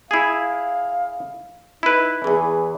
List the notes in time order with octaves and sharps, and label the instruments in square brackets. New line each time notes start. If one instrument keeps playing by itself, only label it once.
[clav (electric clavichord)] E4 G#4 [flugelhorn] F5
[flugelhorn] D#4 [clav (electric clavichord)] E4 B4
[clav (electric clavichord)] E2 E3 [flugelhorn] G#4